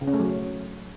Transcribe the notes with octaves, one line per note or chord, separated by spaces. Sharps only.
C#3
C#4
A3
F#3